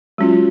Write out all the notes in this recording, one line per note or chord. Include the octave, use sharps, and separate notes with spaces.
F#3 G#3 C#4 F4